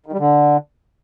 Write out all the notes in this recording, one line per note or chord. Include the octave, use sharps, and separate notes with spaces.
D#3
G3
D3